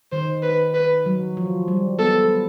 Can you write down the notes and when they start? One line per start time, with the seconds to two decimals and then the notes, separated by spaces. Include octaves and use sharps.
0.12 D#3 C5
0.43 B4
0.74 B4
1.06 F#3
1.37 F3
1.68 G3
1.99 B3 A4